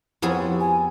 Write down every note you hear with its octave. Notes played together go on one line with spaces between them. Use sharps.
F2 B3 E4 G4 G#4 C5
G#5